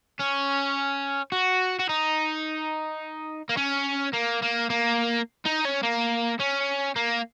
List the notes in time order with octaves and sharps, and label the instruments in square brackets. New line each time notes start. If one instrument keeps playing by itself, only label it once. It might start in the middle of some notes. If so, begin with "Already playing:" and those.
[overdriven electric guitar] C#4
F#4
F#4
D#4
A#3
C#4
A#3
A#3
A#3
D#4
C#4
A#3
C#4
A#3